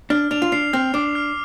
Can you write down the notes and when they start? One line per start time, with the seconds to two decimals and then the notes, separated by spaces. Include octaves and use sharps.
0.10 D4 F6
0.31 D4 F7
0.42 F4
0.52 D4 C7
0.73 C4 F6
0.94 D4 D6
1.15 F6